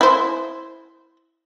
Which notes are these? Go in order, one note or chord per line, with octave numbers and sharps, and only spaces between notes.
E4 C5